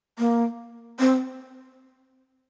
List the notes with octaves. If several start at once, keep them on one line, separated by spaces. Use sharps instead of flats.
A#3
C4